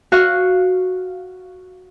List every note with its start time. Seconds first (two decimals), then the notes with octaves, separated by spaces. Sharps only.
0.12 F#4 F5 F#6